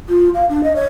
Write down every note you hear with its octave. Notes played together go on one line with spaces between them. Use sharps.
F4
F5
D4
D#5
C#5